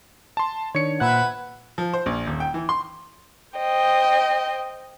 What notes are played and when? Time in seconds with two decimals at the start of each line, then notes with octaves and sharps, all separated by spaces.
0.37 A5 C6
0.75 D#3 D4 C#5 C#7
1.00 A#2 B4 C5 E5 F#5 F#6 G#6
1.78 F3
1.94 C5
2.06 A#1
2.27 D#1
2.40 G5
2.54 E3
2.69 C6
3.57 C5 D#5 G5